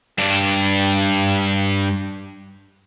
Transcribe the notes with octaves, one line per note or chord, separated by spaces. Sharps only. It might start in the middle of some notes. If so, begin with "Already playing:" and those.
G2 D4